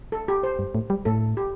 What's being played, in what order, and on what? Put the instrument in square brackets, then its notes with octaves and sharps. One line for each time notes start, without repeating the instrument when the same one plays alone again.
[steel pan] A4
G4
C5
[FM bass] G2
A2
G3
[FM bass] A2 [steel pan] A4
[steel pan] G4